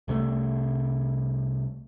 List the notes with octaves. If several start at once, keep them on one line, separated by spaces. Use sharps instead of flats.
C2 C3 F3 A3